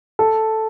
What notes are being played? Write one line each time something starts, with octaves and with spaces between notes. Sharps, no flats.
A4